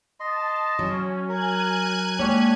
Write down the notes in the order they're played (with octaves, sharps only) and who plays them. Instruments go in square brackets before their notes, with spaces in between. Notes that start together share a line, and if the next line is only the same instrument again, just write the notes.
[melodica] D#5 C6 [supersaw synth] A5
[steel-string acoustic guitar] F#3 [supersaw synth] C#4
[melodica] A#4 [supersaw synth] G#5 F#6 G#6
[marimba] G#3 A#3 [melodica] C#4 D4 G4 [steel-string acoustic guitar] C#5